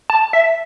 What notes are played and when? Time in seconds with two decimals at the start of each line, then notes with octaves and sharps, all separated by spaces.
0.10 A5
0.33 E5